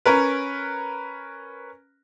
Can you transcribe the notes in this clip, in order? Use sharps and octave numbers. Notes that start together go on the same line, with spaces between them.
C#4 A#4 B4